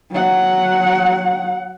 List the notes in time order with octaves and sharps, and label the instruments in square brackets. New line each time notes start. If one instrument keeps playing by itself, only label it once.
[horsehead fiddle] F#3 F#5